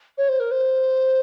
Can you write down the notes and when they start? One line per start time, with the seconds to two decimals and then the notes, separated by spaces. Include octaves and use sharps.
0.17 C#5
0.28 C5
0.39 A#4
0.51 C5